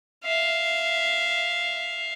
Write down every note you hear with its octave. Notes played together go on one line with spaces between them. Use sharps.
E5 F5